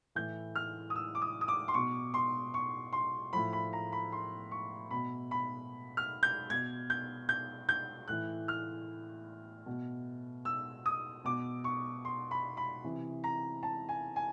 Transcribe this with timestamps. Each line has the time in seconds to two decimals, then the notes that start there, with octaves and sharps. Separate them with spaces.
0.15 A2 E3 G6
0.55 F6
0.90 D#6
0.96 E6
1.15 D6
1.22 D#6
1.41 D#6
1.48 D6
1.68 C6
1.74 B2 C#6
2.14 C6
2.54 C#6
2.93 C6
3.33 A2 F3 B5
3.53 B5
3.73 A#5
3.92 B5
4.12 C6
4.51 C#6
4.91 B2 B5
5.31 B5
5.97 F6
6.23 G6
6.50 B2 G#6
6.90 G6
7.29 G6
7.69 G6
8.08 A2 E3 F#6
8.48 F6
9.66 B2
10.45 E6
10.86 D#6
11.25 B2 D6
11.64 C#6
12.05 C6
12.31 B5
12.57 B5
12.84 C3 E3
13.24 A#5
13.63 A5
13.89 G#5
14.16 G#5